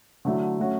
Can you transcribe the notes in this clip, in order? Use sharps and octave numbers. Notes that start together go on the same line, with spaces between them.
D3 F#3 A3 E4
F#3 A3 C#4 F#4